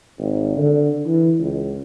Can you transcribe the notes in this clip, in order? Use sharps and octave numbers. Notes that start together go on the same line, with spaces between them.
G#1
D3
E3
C#2